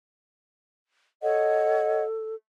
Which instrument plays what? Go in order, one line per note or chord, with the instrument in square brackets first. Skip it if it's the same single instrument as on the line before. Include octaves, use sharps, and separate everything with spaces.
[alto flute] A4 [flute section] C#5 D#5 F#5